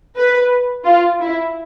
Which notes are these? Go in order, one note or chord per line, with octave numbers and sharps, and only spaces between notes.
B4
F4
E4